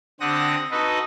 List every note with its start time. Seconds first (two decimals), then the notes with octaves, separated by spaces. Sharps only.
0.20 D3 C4 G4 F#5 D#6 A#6
0.71 D#4 F#4 A4 B4 D#5